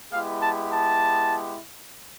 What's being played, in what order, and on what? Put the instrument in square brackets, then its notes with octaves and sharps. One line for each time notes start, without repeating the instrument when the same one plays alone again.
[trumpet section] G#3 B3 E4 G4 F5
A5
A5